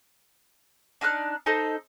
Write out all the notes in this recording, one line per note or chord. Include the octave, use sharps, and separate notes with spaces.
D4 D#4 F6 F#6
D#4 A4 C5 D#5